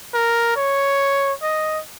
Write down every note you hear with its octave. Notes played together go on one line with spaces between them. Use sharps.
A#4
C#5
D#5